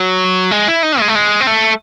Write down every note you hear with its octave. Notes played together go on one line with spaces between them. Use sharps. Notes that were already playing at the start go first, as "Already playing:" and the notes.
Already playing: F#3
G#3
E4
D#4
G#3
A3
G#3
C4
A3